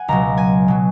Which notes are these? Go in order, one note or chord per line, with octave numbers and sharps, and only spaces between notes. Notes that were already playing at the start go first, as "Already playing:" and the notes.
Already playing: F#5 G#5
C#2 B2 F#3 A#5
G#5
B2 F#3